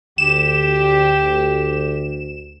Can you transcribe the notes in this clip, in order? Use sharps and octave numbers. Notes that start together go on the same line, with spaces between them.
D2 G4 E7